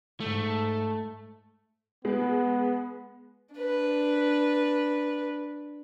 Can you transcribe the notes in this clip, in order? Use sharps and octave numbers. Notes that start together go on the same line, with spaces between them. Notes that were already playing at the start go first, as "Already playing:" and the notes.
G#2 A3
G#3 B3
D4 B4